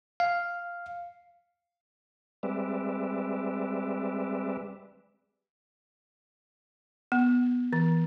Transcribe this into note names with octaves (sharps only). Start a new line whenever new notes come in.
F5
G3 G#3 C4 B4 D5 E5
B3
E3